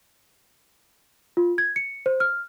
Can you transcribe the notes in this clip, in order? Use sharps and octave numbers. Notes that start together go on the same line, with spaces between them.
F4
G#6
C#7
C5
F6